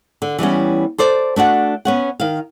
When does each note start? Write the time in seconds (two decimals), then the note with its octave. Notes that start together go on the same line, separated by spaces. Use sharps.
0.22 D3
0.39 E3 G3 B3 C#4
0.98 A4 C5 D5
1.36 A3 D4 F#4 F#5
1.85 B3 C#4 F#5
2.20 D#3 F5